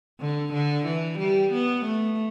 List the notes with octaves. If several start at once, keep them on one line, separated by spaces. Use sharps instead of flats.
D3
D3
E3
G3
B3
A3